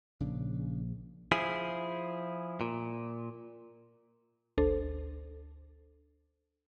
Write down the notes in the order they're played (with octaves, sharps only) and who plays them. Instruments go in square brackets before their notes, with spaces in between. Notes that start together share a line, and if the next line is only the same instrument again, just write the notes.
[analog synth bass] A#1 [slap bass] C#3 D4
[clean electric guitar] F3 E4 G#4
A#2
[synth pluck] G#1 D2 D4 A4 C5